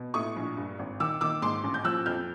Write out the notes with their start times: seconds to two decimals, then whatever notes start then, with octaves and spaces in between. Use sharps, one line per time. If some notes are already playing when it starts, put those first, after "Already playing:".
Already playing: B2
0.14 A2 C#6 D#6
0.36 A#1
0.57 G2
0.79 G#1
1.00 D#3 D6 E6
1.21 D#3 D6 E6
1.42 G#2 C6 D6
1.64 A1
1.74 G6
1.84 F3 E6 F#6
2.06 F2 F6 G6